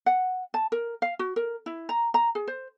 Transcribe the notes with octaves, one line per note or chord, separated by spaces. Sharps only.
F#5
A5
A#4
F5
F#4
A#4
E4
A#5
A#5
G#4
C5